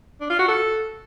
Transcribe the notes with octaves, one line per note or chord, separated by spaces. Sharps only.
D4
F4
F#4
A4